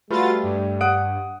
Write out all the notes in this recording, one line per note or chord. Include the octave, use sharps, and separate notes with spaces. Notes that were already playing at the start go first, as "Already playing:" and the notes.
G3 A3 F4 F#4 B4 A6
G2
F#5 D#6 F#6 D7